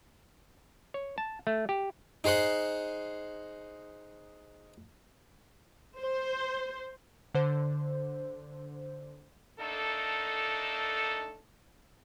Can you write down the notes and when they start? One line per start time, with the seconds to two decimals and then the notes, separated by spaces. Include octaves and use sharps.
0.94 C#5
1.18 A5
1.47 A3
1.69 G4
2.24 D#4 G#4 C5 F#5 C6
5.98 C5
7.34 D3 C5
9.60 A3 A#3 D4 D#4 A4